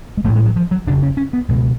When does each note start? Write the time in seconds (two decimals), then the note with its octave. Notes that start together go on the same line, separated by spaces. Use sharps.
0.17 G#3
0.24 A1 A3
0.29 A2
0.36 G#3
0.45 F#3
0.56 F3
0.71 F#3
0.87 F#1 F2 C#3 D4
1.03 C#4
1.17 C#4
1.33 B3
1.48 C#2 B2 G#3